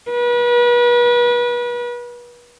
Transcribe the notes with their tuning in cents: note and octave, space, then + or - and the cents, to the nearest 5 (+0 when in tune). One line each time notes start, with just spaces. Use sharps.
B4 -35